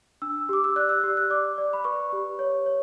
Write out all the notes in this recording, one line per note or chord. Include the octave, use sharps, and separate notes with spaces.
D4 E6
G4 D6
E6
D5 F#6
E6
G4
F#6
D5 D6
D5
B5
B4 C#6
G4
C#5
C#5